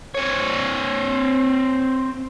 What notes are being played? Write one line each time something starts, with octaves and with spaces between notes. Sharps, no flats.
C4 C#5